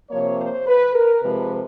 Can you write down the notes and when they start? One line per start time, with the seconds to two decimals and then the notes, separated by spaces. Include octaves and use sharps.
0.10 C3 F3 A#3 C#5
0.38 C5
0.66 B4
0.94 A#4
1.22 C3 F3 G#3 B4